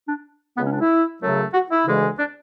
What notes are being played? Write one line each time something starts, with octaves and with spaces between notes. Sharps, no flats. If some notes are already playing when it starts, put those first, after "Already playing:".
D4
C#2 C#3 G#3 B3
C#4
D4
E4
F#2 C#3 F#3 A3
F#4
E4
D2 C#3 E3 G#3
D4